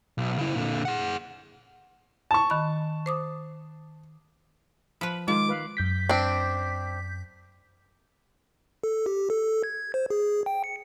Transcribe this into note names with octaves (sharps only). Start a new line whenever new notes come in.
B1
C#3 E4
A#2 D3
G#4 F#5
A5 C#6
D#3 B5
C5 D6 D#6
F3 B4 B5
D#3 G#3 F4 D6
B4 F5
F#2 G6 B6
C4 D4
A4
G4
A4
G#6
C5
G#4
G5
C#7